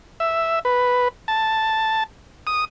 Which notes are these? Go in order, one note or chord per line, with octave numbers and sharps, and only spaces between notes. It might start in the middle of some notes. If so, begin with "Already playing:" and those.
E5
B4
A5
D#6